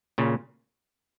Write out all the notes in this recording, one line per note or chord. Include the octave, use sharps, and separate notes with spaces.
A#2 C#3